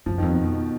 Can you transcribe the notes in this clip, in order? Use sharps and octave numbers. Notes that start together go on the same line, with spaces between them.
F#2 F3
F2 D#3
B2
B2